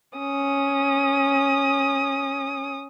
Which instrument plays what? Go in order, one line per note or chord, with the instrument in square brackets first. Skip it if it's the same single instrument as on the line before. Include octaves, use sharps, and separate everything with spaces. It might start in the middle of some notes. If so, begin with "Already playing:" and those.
[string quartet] C#4 D#6